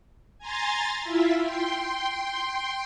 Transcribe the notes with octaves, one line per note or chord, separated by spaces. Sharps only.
G#5 A#5 C6 A6
E4 F4 E5
G5 C6